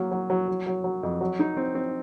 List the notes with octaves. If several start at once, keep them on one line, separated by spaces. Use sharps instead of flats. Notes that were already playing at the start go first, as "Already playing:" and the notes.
Already playing: F#3 A#3
F#3
F#3
F#3
F#3
F#3
F2
F#3
D#4
C4
C4